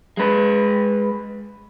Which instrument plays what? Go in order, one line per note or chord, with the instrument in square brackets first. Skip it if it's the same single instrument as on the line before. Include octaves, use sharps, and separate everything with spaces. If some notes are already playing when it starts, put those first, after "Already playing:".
[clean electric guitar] G#3 B4